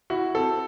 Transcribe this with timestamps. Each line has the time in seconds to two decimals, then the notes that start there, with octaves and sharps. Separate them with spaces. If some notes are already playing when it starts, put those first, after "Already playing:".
0.10 E4 F#4
0.35 C4 A4